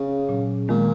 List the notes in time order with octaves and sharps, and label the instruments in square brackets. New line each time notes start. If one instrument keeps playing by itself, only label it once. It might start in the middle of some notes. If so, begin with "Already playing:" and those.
Already playing: [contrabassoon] C#3
[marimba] A#2 F#3 C#4
[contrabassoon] A#2 [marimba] D#3 G#3 B3